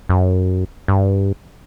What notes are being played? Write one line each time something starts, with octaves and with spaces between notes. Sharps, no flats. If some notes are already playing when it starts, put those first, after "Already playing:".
F#2
G2